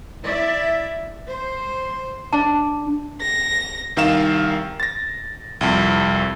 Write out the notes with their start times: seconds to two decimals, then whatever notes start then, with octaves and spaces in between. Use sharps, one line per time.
0.25 E4 D5 E5
1.28 C5
2.33 D4 A5
3.21 A#6
3.96 C2 D#3 A#4 F5 E7
4.80 A6 A#6
5.61 C2 F2